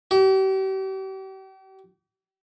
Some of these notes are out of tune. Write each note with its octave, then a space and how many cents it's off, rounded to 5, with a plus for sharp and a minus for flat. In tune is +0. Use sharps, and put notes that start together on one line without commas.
G4 -40